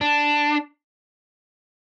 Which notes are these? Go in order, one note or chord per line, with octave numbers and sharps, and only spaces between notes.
D4